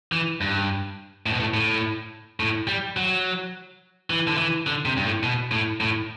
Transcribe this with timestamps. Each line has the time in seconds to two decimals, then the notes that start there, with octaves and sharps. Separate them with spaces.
0.12 E3
0.41 G2
1.26 A2
1.32 B2
1.40 A2
1.54 A2
2.40 A2
2.67 G3
2.97 F#3
4.10 E3
4.27 D3
4.38 E3
4.67 D3
4.85 C3
4.97 G2
5.05 A2
5.23 B2
5.52 A2
5.81 A2